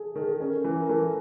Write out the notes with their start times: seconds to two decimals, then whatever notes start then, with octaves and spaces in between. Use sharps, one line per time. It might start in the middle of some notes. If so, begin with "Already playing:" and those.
Already playing: G#4 A4
0.15 D#3 A4
0.22 G#4
0.30 A4
0.40 C#4 A#4
0.64 E3
0.80 A#4
0.89 E3 A4